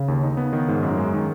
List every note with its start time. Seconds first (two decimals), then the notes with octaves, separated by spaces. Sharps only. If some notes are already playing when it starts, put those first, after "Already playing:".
Already playing: C#3
0.08 D#2
0.23 D#4
0.37 B3
0.53 D#3
0.68 G#2
0.83 F#2
0.97 G#3
1.13 D#3